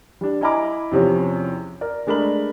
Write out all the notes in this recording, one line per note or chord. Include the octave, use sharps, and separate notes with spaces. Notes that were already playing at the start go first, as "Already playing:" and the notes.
G3 D4
E4 D#5 G#5 A#5 B5 D6
E2 C3 F3 C#4
A#4 D5
G#3 A3 D4 A#4 B5 F#7